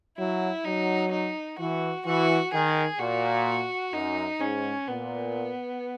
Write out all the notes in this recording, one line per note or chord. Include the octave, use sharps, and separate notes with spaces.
F#3 E4
F#3 D#4
D#4
E3 F#4
E3 F#4
D#3 G#4
A#2 F#4
F#2 D#4
G#2 C#4
A#2 B3